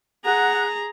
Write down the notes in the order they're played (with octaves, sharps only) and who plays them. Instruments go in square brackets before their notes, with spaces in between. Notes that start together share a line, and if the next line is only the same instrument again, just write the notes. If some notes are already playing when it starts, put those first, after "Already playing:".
[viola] G#4 A#5 [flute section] F#5 F#6